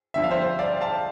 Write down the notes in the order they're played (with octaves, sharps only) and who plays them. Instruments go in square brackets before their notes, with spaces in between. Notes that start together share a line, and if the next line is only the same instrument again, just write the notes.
[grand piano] F2 D3 G3 E5
F5
C5 E5
D5 F5
F5 A5